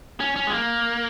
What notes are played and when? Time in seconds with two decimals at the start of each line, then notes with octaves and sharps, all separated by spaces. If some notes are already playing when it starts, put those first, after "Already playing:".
0.20 C#4
0.36 C#4
0.47 G#3
0.51 A#3